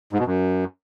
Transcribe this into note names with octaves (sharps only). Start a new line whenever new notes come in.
G#2
B2
F#2